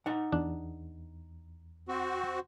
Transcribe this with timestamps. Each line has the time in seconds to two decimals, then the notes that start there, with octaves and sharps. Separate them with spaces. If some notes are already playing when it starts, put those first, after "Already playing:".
0.06 D#4 F#5
0.32 E2 D4
1.88 C4 F#4